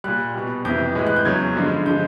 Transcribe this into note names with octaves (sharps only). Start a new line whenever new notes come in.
A#2 G3 F#6
B2 G3
F2 C3 E3 G6
A2 E3 G#3
F#6
G6
E2 C#3 F#3 G#6
G2 D3 F3 G#3
D3 F3 G#3 G6